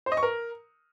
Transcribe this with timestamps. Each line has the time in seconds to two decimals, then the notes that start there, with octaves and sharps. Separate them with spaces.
0.06 C5
0.12 D#5
0.17 C#6
0.23 A#4